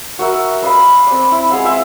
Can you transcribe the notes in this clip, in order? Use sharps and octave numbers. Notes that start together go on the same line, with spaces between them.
F#4 A#4 E5
B4 D#5 F5 B5
C4 D5
E4
G#3 F5 F#5 G#5
F4 E5